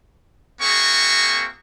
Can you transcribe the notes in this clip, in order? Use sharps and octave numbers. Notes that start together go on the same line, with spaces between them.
A#3 C4 F#4 G#4 E5 C#6